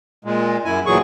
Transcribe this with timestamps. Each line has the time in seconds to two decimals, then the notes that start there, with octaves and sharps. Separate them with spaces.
0.25 A#2 G#3
0.65 F#2 E4 G#5
0.86 D2 A#2 E3 F#3 G#4 C#6